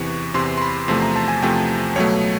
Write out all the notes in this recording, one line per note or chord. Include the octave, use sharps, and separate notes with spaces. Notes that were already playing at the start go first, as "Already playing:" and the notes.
Already playing: E2 C3 E3 C#6
E2 C3 E3 C6
C6
B5
E2 C3 F3 A3 C6
A#5
A5
G#5
E2 C3 F3 A3 G5
C#2 B2 F#3 A3 C#5